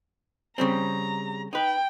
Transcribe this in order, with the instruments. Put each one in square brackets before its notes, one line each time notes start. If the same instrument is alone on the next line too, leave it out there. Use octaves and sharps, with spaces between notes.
[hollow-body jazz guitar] C#3 G3 C4 [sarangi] A#5
[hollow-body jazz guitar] D#4 B4 [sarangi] G5